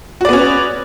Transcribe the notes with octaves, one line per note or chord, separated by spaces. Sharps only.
B3 C#4 F#4 D5